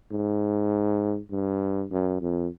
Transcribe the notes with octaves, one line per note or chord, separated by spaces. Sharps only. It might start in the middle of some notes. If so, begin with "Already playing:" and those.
G#2
G2
F#2
F2